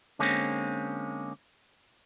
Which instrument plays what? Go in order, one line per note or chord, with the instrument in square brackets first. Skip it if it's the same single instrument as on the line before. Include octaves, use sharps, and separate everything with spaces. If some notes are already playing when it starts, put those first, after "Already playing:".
[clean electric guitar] D3 G#3 A#3 C4 C#4